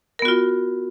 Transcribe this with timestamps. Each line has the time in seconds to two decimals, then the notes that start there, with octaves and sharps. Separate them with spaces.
0.19 A#4
0.22 B3
0.25 F#4
0.28 F4